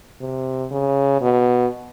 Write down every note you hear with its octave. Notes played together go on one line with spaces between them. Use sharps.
C3
C#3
B2